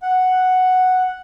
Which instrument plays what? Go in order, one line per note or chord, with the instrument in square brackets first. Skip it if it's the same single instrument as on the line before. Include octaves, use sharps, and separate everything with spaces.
[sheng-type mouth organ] F#5